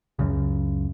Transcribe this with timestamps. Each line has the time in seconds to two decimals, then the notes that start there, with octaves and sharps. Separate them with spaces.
0.19 C#2 F#2 C#3